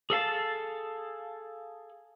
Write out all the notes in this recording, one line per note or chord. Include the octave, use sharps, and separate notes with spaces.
G#4 A4 F5 A5